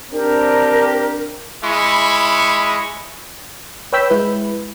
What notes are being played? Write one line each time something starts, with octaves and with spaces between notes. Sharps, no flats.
C4 D4 G4 A#4
G#3 E4 B5 C#6
B4 C#5 G5 E6 G6 B6
G#3 E4 B4